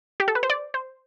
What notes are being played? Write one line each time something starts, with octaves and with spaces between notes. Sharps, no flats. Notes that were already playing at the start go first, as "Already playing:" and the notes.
G4
A4
B4
C5
D5
C5